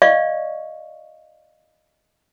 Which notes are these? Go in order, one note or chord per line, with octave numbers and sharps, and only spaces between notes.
D5 D#5 F5 C#6